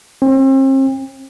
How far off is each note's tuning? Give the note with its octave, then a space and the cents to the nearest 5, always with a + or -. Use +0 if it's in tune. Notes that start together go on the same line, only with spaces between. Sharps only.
C4 +40